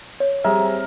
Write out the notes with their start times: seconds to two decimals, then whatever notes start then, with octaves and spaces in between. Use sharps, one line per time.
0.20 C#5
0.44 G3 C4 G#4 A#4 E5